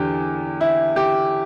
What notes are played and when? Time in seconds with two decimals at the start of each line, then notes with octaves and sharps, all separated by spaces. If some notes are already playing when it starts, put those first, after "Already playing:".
Already playing: E2 D3 G4
0.61 E4
0.96 G4